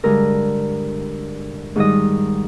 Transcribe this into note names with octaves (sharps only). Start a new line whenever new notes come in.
G2 D3 G#3 A#4
G#2 D#3 G3 D#5